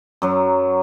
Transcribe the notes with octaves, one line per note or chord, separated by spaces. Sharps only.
F#2 F#3